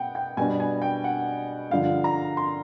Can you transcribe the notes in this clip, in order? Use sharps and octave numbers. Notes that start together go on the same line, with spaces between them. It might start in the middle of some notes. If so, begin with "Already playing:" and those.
Already playing: B2 B3 F#5 G5
G5
B2 G3 B3 D4 G#5
G#5
G5
F#5
G2 D3 F3 F5
A#5
C6